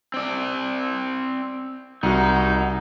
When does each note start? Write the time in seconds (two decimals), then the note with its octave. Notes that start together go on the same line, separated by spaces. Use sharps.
0.14 C4 D5
2.03 C2 D#4 F#4